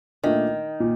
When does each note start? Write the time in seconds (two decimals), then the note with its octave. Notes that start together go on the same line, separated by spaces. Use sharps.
0.23 A#2 D#3 A3 D4
0.80 A#2